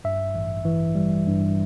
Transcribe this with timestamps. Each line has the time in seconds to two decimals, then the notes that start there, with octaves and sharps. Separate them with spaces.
0.04 G2 E5
0.35 A1
0.65 E3
0.95 G3
1.27 G2